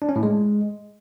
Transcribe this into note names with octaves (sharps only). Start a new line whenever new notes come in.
D4
C#4
A2
G#3